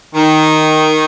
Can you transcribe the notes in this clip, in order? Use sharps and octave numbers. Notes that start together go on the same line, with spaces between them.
D#3